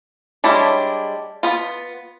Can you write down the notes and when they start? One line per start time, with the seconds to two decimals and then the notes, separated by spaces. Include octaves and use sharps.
0.44 G3 G#3 D4 E4 C#5
1.43 B3 F4